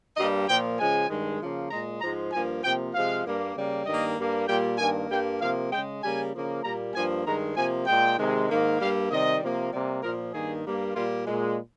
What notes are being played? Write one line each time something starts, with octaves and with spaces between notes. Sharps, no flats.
G2 G3 A#3 D#5
A#2 F3 A#3 G5
C#3 F3 G#3 G#5
G2 D#3 G#3
C#3 F3 A#3
A#2 G#3 A#5
G#2 F3 G#3 A#5
G2 F3 A#3 G#5
C3 F3 A#3 G5
C3 F3 G#3 F5
G2 G3 A#3
C#3 G3 A#3
G2 D#3 G3 A#3 D#5
G2 G3 A#3
A#2 G3 A#3 G5
G2 D#3 A#3 G#5
G2 G3 A#3 G5
C3 F3 A#3 F5
C#3 G#3 G5
C#3 G3 A#3 G#5
C#3 F3 A#3
A#2 G3 A#3 A#5
G2 F3 A#3 G#5
G2 D#3 G#3 A#5
C3 F3 A#3 G#5
A#2 G#3 G5
C3 D#3 G#3
G#2 D#3 A#3
G2 G3 A#3 F5
C3 D#3 G3 D#5
C3 F3 A#3
C3 G3 A#3
A#2 F3 A#3 A#4
G2 D#3 A#3 G#4
G2 G3 A#3
A#2 G3 A#3 F4
A#2 G#3